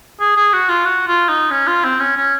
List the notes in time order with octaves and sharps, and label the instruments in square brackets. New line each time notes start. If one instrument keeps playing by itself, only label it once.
[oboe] G#4
G#4
F#4
F4
F#4
F4
D#4
C#4
F4
C4
C#4
C#4